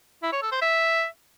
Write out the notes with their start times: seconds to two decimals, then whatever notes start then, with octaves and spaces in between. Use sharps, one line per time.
0.23 E4
0.33 C#5
0.42 A4
0.52 C5
0.62 E5